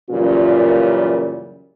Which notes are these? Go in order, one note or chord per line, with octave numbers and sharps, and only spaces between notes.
F#2 A#2 C#3 E3 G3 F4